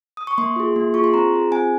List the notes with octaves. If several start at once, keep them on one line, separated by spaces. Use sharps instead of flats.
D#6
C#6
A#3 C6
F4 G#4
A#3
F4 G#4 C#6
C6
C4 A#5
F4 G#4
C4 G#5